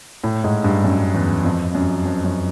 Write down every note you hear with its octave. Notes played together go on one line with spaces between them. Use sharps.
A2
G#2
G2
F#2
E2
F2
F#2
F2
F#2